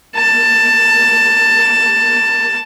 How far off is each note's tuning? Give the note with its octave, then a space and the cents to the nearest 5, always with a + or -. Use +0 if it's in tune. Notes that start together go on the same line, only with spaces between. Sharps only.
A5 +15